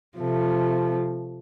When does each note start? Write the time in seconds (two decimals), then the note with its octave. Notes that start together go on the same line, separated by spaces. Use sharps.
0.16 C3 F3 A3